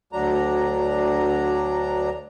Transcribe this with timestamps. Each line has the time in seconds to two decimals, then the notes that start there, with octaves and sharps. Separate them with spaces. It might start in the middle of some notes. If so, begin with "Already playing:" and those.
0.13 D2 F#3 D4 A#5